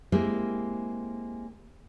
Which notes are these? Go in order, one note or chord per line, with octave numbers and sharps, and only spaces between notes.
G#3 A#3 C4 E4 G4 A#4